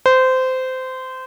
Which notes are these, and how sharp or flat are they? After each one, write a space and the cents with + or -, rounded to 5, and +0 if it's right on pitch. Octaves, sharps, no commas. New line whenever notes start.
C5 -20